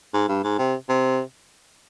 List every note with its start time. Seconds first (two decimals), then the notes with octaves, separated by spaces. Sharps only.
0.14 G#2
0.29 G2
0.44 G#2
0.59 C3
0.89 C3